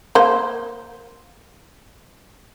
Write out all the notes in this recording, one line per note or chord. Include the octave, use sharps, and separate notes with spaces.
A#3 C5